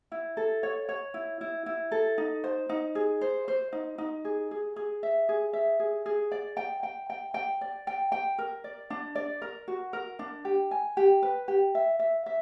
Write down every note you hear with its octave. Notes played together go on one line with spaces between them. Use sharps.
E4
A4
C#5
C#5
E4
E4
E4
A4
D#4
C5
D#4
G#4
C5
C5
D#4
D#4
G#4
G#4
G#4
E5
G#4
E5
G#4
G#4
D5
G5
G5
G5
G5
D5
G5
G5
A#4
D5
D4
D5
A#4
F#4
A#4
D4
G4
G#5
G4
B4
G4
E5
E5
E5